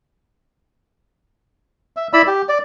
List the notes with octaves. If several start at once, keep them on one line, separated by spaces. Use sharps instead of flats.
E5
E4 D5 B5 E6
G4
D5